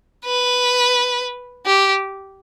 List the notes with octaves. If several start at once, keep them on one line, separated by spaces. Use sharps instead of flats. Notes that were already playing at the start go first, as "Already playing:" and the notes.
B4
G4